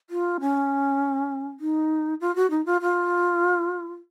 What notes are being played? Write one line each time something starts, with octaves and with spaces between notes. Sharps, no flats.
F4
C#4
D#4
F4
F#4
D#4
F4
F4